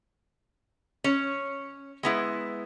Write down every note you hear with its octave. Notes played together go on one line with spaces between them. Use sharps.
C#4 C#5
G#3 B3 E4